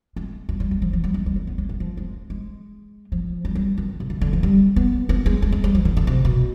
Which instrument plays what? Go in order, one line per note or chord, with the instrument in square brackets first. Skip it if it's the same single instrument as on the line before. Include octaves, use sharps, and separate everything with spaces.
[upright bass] G#3
G#3
G3
G3
F3
F3
G3
G#3
G#3
G3
B3
G#3
D#3
F3
G#3
G#3
F3
G3
G3
D#3
C3
D3
D3
F3
G3
B3
B3
G#3
G#3
G#3
G3
F3
D#3
D3
C3
B2